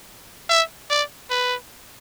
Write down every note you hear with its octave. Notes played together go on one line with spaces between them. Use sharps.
E5
D5
B4